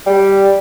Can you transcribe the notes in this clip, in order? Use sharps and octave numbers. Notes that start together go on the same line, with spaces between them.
G3